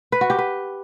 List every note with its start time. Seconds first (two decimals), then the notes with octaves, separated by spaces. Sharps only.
0.12 B4
0.21 F#4
0.30 G4
0.38 B4